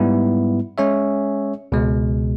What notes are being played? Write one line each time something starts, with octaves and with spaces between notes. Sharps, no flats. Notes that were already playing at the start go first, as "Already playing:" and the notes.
Already playing: G#2 G3 B3 E4
G#3 C#4 G#4 C#5 E5
C#2 B2 G#3